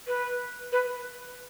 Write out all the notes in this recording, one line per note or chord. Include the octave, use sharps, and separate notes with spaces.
B4
B4